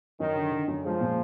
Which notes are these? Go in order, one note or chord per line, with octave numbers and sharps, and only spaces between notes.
F#2 D#3
D3
D3
F#2
F3 G#3
A#2